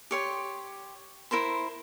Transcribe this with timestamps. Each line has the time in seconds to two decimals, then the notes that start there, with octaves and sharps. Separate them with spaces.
0.11 G4 C#5 C6
1.31 E4 A#4 C5 B5